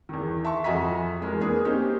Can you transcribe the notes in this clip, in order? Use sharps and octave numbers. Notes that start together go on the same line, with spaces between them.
E2 D#3
E5 A5 C6 C#6
F2 F#4 D#5 G#5 A#5 B6
E2 G#3 A#4
A#3 B3 D4 G#4 A#4
A#3 C4 C#4 D#4 G4